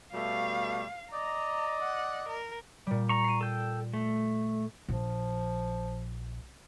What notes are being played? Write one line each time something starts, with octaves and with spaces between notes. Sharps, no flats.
B2 G3 A3 F5
D5 D#5 A#5
F#5
A#4
A#2 G3
A#5 C#6
C7 D#7
A4 G5
A3
A#1 F3